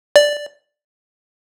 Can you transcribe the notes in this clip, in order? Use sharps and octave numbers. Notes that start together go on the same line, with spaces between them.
D5